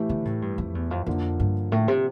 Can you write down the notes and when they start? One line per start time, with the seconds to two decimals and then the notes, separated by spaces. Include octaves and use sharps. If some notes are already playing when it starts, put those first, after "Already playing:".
Already playing: A2 E3 A3 E4 G4
0.09 D3
0.25 A2
0.42 G2
0.58 F2
0.75 E2
0.91 F2
1.06 F2 D3 F3 A#3
1.40 G2
1.72 A2
1.88 C3